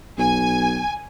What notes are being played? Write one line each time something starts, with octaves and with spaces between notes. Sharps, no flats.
B1 G#5